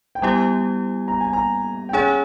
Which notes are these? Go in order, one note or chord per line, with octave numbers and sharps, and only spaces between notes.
G5
G3 B3 E4 G4 G#5
A#5
G#5
A#5
G5
C#4 G#4 C#5 G#5